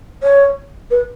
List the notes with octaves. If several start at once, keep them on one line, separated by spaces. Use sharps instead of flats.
C#5
B4